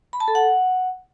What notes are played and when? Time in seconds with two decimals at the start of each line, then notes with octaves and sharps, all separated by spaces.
0.13 B5
0.20 A5
0.28 A4
0.35 F#5